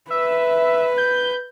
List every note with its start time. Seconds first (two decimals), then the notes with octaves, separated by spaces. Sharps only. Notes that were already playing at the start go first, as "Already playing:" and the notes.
0.10 B4 E5
0.98 G6